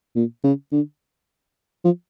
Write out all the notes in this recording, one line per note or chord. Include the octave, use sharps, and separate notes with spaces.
A#2
C#3
D3
F3